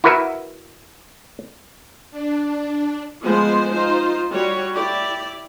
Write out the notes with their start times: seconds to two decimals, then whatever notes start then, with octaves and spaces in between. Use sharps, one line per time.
0.04 E4 F#4 A#4 B4 E5
2.11 D4
3.23 F3 G#3 B3 F4 C5
3.72 D#4 F4 C5
4.32 G3 F#4 C#5
4.75 E4 G4 D5